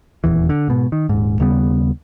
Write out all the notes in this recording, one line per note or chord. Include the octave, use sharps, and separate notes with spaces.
D#1 E2 E3
D3
G#2 B2
D#3
D#1 G#2
D#2 C#3 G3 B3